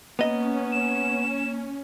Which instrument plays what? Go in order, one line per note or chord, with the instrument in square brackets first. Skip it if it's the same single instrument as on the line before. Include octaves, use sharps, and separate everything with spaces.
[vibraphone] A#3 [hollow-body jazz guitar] B3 D#5 [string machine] C#4
[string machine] C#4 [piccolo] E7